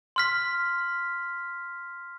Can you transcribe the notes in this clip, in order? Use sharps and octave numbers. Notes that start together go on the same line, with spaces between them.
C6 F6 B6